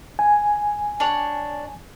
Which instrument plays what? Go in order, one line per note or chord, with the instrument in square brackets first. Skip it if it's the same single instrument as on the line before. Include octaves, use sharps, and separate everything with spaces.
[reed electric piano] G#5
[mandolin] D4 C#5